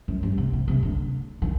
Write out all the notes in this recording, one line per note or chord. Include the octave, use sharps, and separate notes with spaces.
F#2
G2
C3
C3
C3
D3
D#3